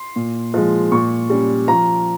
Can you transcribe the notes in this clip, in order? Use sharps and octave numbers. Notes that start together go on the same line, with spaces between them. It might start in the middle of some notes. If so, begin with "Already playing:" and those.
Already playing: C6
A#2
F3 G#3
A#2 C#6
G3 C#4
F3 A#5